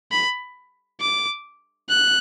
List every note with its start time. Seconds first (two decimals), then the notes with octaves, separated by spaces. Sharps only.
0.12 B5
1.01 D6
1.89 F#6